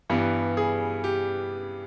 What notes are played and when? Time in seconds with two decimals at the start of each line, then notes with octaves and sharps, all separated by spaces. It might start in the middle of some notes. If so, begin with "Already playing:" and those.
0.10 G2 E3 G3 B3
0.57 G#4
1.04 G4